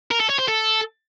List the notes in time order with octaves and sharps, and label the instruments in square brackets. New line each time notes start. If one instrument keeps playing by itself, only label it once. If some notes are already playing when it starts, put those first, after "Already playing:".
[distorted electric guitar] A#4
A4
C#5
C5
A4